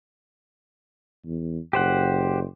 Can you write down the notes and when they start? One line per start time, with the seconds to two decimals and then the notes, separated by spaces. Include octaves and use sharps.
1.25 E2
1.73 F#1 G4 C5 F#5